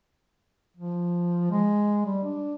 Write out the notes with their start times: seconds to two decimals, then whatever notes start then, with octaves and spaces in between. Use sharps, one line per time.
0.77 F3
1.51 G#3
2.06 G3
2.24 D4